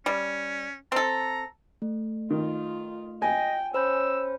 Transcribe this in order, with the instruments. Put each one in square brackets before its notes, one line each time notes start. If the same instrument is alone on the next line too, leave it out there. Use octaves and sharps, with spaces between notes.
[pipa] G3 [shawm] C#4
[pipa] C4 A4 [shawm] A#5
[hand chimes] A3
[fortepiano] D#3 [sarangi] F4
[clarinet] D#5 [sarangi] G5 [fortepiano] G#5
[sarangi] C#4 [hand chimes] C5 B5 G6 [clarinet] E6